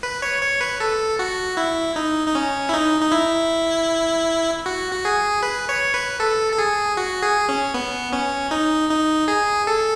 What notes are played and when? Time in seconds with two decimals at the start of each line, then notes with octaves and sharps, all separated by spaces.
0.03 B4
0.22 C#5
0.42 C#5
0.61 B4
0.80 A4
1.19 F#4
1.57 E4
1.96 D#4
2.28 D#4
2.35 C#4
2.69 E4
2.74 D#4
3.01 D#4
3.12 E4
4.66 F#4
4.92 F#4
5.05 G#4
5.43 B4
5.69 C#5
5.94 B4
6.20 A4
6.52 A4
6.59 G#4
6.97 F#4
7.22 G#4
7.49 C#4
7.74 B3
8.13 C#4
8.51 D#4
8.90 D#4
9.28 G#4
9.67 A4